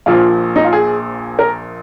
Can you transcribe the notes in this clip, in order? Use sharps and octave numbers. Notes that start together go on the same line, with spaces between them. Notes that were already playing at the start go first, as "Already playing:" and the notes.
A#1 A#2 F3 F4
D#4
F4
G#4
A#4